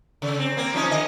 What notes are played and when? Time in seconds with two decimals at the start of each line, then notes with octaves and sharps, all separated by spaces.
0.22 C#3
0.39 C4
0.57 A#3 C4
0.74 F3 C#4 D#4
0.91 D3 D#5